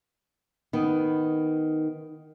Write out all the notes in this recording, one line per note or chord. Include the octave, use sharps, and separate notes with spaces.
D#3 B3